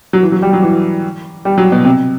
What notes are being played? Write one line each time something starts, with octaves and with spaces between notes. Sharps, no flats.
F#3
E3
F#3
G3
F#3
E3
G3
F#3
B2
C3